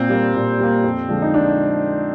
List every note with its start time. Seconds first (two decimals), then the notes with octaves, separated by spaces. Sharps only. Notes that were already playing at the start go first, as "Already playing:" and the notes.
Already playing: A#2 C4
0.09 G3 A#3
0.35 A#2
0.59 G3 A#3
0.84 F2
1.09 D3 F3 G#3
1.22 D#4
1.34 D4